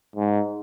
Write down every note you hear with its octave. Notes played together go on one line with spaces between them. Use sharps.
G#2